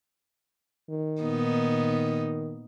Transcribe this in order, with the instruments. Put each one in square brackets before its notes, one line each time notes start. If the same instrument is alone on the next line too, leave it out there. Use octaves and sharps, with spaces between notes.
[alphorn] D#3
[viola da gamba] A#2 B3 D#4